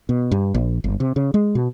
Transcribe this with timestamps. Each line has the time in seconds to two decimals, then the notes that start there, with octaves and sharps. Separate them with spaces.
0.09 B2
0.31 G2
0.54 A#1
0.84 G1
1.00 C3
1.16 C#3
1.34 G#3
1.55 B2